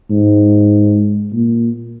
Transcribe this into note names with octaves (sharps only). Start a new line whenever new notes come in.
G#2
A#2